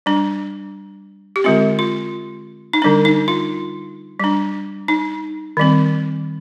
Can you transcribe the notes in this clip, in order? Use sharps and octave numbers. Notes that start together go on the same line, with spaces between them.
G3 D4
G4
D3 G#3 C4 F4
F4
D#4
D3 G3 D4
D#4
F4
G3 D4
D#4
D#3 G3 C4